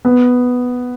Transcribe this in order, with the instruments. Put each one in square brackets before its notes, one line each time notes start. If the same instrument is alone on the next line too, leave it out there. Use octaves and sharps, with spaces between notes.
[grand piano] B3